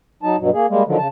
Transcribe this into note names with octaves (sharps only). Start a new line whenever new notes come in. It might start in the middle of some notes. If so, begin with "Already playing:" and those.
F#3 D#4 A5
G2 B2 F#3
A#3 G#4
G3 G#3 A#3
D3 D#3 F3 F#3
C#3 A5